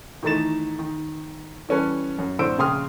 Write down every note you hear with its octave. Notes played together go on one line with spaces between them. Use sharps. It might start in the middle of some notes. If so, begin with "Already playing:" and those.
D#3 E3 A3 D#4 A6 E7
D#3
E3 G3 C#4 A4 B4
F#2
F2 A2 D3 C5 E6 D7
A#1 C#3 G5 C6 D#6 F6